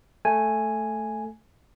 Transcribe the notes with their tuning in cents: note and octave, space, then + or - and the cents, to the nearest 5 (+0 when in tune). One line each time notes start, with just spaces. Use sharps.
A3 +0 G#5 +0